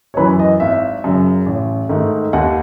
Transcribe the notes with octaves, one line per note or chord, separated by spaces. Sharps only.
C#5
F#2 E3 B4
D#5
G#1 E5
F#2 C#3
A1
G#2 D#3 A3
D#2 F#5